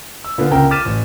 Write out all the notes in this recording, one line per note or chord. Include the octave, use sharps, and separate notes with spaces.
E6
A#2 D3 A#3 B3
C#2 C#3 A#4 G5
D6 F6 A6 B6 D#7 E7
A1